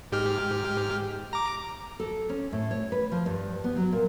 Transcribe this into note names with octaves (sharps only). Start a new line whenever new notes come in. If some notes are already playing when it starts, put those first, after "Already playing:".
G#2 G4 F6
A#5 D6
A4
C#4
A2
C#5
B4
F3
G2
B3
F#3
A#2